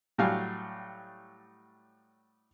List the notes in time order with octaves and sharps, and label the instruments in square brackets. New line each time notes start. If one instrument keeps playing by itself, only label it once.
[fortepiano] A2 F#3 G3 F5 G#5